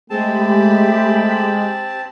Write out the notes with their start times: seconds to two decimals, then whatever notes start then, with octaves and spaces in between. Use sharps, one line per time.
0.10 G#3 A3 C4 G4 A5 B5